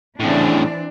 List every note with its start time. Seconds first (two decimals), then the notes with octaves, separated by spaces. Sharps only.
0.20 A2 C#3 E3 C4 D4